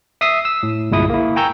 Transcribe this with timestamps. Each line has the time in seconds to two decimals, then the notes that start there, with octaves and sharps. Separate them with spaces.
0.21 E5 D#6 E6 C7
0.45 E6
0.63 A2
0.91 G1 C2 A#2 G#3 E4 D#6
1.10 A#3 E4
1.36 G5 G#5 A#5 C#6 E6 G6